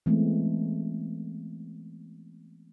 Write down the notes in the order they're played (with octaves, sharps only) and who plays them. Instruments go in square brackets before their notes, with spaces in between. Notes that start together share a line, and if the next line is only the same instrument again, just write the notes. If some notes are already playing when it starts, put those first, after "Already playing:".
[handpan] E3 G#3 A3 B3 C4